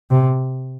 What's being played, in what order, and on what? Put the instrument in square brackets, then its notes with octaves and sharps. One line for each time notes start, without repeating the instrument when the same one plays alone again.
[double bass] C3